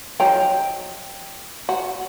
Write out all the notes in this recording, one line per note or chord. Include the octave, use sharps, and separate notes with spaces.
F3 F#3 D#4 G5
F#4